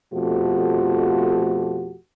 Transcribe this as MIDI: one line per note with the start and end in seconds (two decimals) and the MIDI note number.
0.13 1.96 41
0.13 1.96 47
0.13 1.96 53
0.13 1.96 57
0.13 1.96 66
0.13 1.96 67